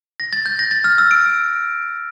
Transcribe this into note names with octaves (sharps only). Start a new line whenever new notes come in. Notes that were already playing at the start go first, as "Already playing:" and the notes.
A#6
A6
G6
A#6
A6
F6
E6
D7